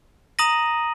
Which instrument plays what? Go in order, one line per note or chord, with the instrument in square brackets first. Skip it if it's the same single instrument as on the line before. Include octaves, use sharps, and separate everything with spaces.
[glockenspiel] A#5 D#6 A#6 D#7 F#7